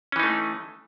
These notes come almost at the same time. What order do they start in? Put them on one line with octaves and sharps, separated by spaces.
C#4 E3 D#4 A3